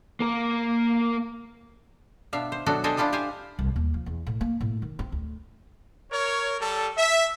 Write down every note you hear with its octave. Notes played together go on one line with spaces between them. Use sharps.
A#3 A#4
B2 D4 E5 F5
C5
B2 F#3 D4 F#4 A4
D4 G4 A4 C5 D#5 G#5
D4 E4 F4 G4 A4
G4 C5 F5 G#5
C2
D#2
F3
E2
A2
A#3
A2
D#3
C4
D2
A#4 C#5
G3 A4
E5